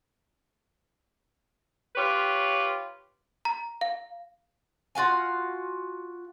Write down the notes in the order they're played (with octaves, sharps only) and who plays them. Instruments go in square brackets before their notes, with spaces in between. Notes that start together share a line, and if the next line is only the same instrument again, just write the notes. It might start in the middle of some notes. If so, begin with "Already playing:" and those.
[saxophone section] F4 G4 B4 C#5
[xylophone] A#5
F5
[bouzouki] F4 F#4 F5 G#5